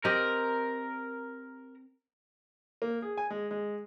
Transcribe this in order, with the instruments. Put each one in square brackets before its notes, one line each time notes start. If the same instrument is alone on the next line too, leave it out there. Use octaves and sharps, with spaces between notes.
[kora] C4 G4 D#5 [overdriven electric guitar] A#4
[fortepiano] A#3
G#4
G#5
G#3
G#3